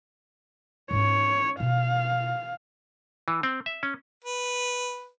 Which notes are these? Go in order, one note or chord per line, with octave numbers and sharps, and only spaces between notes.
G#2 C#4 C#5
B2 F5
E3
C4
E5
C#4
B4